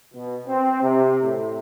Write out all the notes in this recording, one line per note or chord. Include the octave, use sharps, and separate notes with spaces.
B2
C4
C3
A2